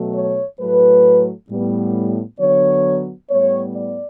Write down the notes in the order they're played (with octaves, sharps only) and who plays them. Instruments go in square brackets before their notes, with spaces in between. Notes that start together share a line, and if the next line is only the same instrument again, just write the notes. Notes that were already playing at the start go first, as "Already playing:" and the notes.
Already playing: [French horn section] B2 F#3 A3
C#5
A2 F#3 A3 B4
A2 G3 B3
D3 F#3 B3 C#5
A2 G3 B3 C#5
D5